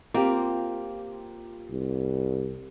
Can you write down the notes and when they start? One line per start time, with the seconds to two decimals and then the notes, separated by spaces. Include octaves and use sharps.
0.14 A#3 C4 F4 G4
1.71 C2